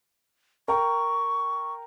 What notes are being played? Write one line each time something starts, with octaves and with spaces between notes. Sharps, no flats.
A#4 G5 A#5 C#6